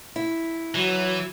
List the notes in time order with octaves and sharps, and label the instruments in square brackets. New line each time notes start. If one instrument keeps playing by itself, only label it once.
[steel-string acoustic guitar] E4
[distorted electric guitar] E3 [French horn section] F#3 [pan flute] F#4